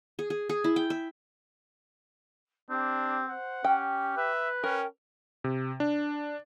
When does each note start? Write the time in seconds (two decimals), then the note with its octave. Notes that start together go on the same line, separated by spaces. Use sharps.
0.19 G#4
0.30 G#4
0.49 G#4
0.64 E4
0.76 G5
0.90 E5
2.70 C4 D4 G4
3.29 C5 F#5
3.64 C#4 G4 G5
4.17 B4 E5
4.64 C#4 A#4 G5
5.44 C3
5.80 D4